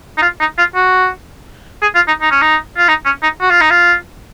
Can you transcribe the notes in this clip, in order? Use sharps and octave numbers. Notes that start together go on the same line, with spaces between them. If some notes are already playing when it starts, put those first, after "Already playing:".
D#4
F4
D#4
F4
F#4
G#4
F4
D#4
D#4
C#4
D#4
F4
D#4
C#4
D#4
F#4
F4
D#4
F4